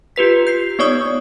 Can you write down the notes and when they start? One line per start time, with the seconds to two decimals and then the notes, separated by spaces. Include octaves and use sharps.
0.16 F4 G4 B4 B6
0.47 G6 C7
0.79 B3 D#4 C#5 D5 C#6 D#6